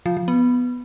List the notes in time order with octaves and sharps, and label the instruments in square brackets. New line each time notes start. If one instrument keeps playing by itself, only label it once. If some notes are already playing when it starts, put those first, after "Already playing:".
[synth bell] F3
F3
B3